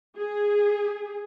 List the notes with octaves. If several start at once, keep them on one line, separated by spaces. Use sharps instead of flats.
G#4